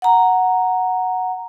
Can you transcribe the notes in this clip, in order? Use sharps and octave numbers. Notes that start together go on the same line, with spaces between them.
F#5 A#5